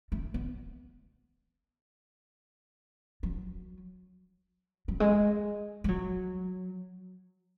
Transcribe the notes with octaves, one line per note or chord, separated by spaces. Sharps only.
A3
B3
F#3
F#3
G#3
G#3
F#3